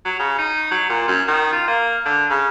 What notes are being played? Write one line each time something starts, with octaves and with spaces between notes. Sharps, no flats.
F#3
C#3
D#4
F#3
A#2
F#2
D#3
F4
A#3
D3
C#3